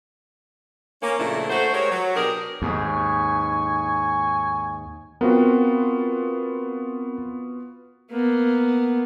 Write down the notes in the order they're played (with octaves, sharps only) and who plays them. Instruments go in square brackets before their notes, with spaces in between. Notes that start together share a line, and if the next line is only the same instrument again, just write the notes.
[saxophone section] A#3 C#4
A#2 C#3 F3 A3 D4 E4
A3 F#4 C5
G#3 G4 A#4 C#5
F#3
B2 D4 G4 G#4 A#4
[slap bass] D#2 G#2 [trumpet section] G#5 C#6
[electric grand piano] B3 F4 F#4 [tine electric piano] C4 A#4
[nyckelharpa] A#3 B3